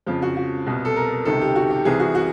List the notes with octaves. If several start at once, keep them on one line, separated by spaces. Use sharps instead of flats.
F2 C#3 F3 F4
F#4
F#4
C2 B2
A4
A#4
C#2 C3 D#3 A4
G4
F#4
G4
C2 C3 E3 G#4
F#4
F#4